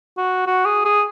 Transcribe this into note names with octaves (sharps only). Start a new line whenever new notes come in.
F#4
F#4
G#4
G#4